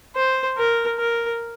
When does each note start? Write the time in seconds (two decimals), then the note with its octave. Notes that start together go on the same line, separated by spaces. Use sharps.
0.16 C5
0.57 A#4
0.99 A#4